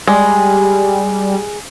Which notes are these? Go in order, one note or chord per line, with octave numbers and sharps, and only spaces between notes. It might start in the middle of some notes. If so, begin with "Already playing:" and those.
G3 G#3